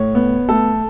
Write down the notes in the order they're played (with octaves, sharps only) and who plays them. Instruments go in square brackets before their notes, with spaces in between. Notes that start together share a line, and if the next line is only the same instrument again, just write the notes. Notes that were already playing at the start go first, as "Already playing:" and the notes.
Already playing: [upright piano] A2 C#5
B3
A3 A4